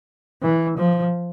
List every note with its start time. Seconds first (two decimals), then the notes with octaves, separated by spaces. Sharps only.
0.42 E3
0.77 F3